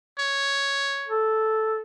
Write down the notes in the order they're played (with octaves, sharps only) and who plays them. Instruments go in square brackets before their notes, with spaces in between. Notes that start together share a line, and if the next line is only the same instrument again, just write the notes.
[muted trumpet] C#5
[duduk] A4